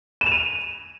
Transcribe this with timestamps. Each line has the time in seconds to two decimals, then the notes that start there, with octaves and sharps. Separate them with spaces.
0.21 E7
0.26 F7
0.32 D#7